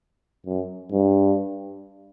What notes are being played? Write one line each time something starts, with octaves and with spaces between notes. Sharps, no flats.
F#2
G2